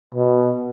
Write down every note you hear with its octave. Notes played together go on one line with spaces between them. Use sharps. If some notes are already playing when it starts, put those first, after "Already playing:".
B2